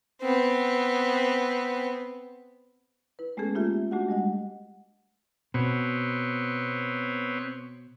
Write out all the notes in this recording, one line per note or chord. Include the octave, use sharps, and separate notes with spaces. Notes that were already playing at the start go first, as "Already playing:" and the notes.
B3 C4
E4 B4
G#3 A3 B3 C#4 G#4 A4
A#3 F4 G4 E5
A3 D4 F#4 G4 F#5
G3 G#3 D#5 F#5
B2 B3 C4 C#5